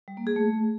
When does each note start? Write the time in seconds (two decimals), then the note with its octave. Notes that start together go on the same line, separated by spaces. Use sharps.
0.08 G3
0.17 A#3
0.27 G#4
0.36 A3